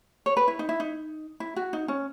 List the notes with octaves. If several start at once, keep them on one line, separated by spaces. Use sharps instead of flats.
C#5
B4
E4
D#4
E4
D#4
E4
F#4
D#4
C#4